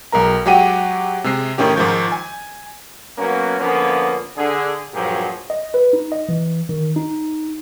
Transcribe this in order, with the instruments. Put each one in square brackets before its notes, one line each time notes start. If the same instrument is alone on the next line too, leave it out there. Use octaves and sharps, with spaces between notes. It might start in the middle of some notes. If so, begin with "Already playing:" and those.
[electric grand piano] B1 G#3 A#4 A#5
F#3 G#3 G4 F#5 G5 D#7
C3 G#3 C7
A2 D#3 C#4 G4
G#2 D#3 F3 G6
G#5
[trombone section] F#3 A#3 B3 C#4
D3 F3 A#3 B3 C#4
D3 G#4
G2 A#2 F3 F#3 G4 G#4
[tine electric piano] D#5
B4
D#4
D#5
E3
D#3
D#4